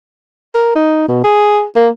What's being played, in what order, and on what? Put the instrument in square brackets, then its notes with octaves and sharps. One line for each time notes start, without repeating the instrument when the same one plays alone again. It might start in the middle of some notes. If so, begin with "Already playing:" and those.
[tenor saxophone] A#4
D#4
B2
G#4
A#3